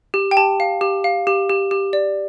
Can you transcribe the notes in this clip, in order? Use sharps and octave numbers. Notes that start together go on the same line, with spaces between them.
G4
G5
G4 A5
F5
G4
F5
G4
G4
G4
D5